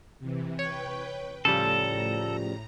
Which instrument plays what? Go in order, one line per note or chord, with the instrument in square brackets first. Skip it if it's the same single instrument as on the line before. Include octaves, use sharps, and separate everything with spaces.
[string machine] C3 E3
[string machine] B4 G5 [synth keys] C#5
[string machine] A2 A#5 [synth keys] C#3 F3 G3 [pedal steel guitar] A4